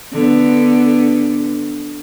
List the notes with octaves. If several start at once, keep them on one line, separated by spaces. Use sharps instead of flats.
D3 B3